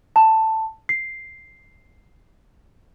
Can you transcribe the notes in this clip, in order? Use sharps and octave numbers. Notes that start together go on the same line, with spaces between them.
A5
C7